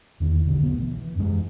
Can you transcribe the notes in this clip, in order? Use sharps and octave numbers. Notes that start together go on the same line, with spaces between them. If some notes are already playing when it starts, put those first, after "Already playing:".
E2 D#3
A1 B2 D3
C2 F#3 A3 B3
E3
F#2 G#3